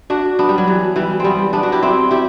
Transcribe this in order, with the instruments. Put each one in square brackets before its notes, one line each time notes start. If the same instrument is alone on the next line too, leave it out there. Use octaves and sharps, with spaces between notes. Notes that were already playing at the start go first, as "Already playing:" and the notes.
[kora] D4 F#4
B3 D4
G3
F#3
E3
E3 G3
G3 B3 C4
B3 D4
D4 F#4
E4 G4
C4 E4
E4 G4